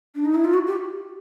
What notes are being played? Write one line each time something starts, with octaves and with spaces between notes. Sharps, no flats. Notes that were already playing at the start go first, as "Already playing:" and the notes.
D4
D#4
E4
F4
F#4
G4